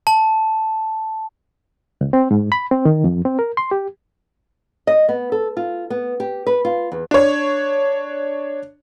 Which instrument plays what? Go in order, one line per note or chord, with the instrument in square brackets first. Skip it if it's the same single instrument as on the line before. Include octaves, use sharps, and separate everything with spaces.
[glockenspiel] A5
[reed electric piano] C#2
C4
G#2
B5
C4
D#3
F2
C4
A#4
C6
G4
[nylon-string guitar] D#5
B3
A4
F4
B3
G4
B4
F4
E2
[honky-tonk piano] D4 C#5